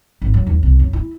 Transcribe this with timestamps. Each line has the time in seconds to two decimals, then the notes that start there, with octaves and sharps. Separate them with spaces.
0.22 G#1
0.34 F#3
0.47 D#2
0.63 C2
0.79 F#2
0.93 E4